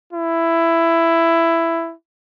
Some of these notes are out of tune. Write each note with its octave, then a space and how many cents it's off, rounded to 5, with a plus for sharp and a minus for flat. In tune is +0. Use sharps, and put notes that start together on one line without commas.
E4 +10